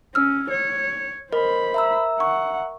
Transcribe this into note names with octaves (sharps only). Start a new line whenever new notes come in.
C#4 E6 F6
C#5
A#4 C5 D#5 B5
E5 A#5 E6
F#5 C#6